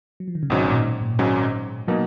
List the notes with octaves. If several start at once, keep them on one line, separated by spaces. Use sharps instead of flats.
F#3
F3
D#3
C#3
G#1 G#2 B2 F#3 C#4
A#2
G#2
A#2
G#1 G#2 F#3 G#3 C#4
B2 F#3 A#3 D#4